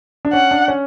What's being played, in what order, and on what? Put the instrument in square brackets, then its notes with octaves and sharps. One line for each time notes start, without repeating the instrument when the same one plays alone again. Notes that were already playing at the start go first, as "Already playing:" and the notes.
[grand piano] D4
[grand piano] C#4 [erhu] F#5
[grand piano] D4
C#4